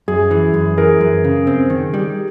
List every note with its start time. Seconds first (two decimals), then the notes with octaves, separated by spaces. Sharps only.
0.08 F#2 G#4
0.31 E3
0.54 F#2
0.78 E3 G#4 A#4
1.01 F#2
1.24 C#3
1.47 C4
1.70 D#3
1.94 G3